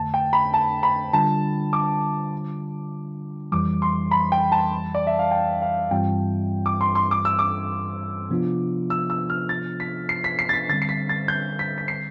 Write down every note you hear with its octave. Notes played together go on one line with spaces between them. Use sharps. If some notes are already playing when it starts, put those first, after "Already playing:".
Already playing: F2 D3 A3 A5
G5
B5
A5
B5
D3 G3 D4 F4 A5
D6
F2 E3 G3 D6
C6
B5
G5
A5
D5
E5
F5
G5
F5
G2 E3 G3 C4 F4 G5
D6
C6
C6
D6
E6
D6
C3 F3 B3 D4 F4
E6
E6
F6
A6
B6
C7
B6
C7
A6
B6
D3 G3 C4 A6
C7
B6
A6
G6
B6
B6
C7